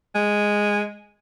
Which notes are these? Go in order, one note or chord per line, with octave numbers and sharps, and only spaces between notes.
G#3